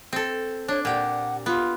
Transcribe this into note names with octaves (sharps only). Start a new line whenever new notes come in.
C4 A4
D4 C#5
A#2 G4 F#5
B3 F4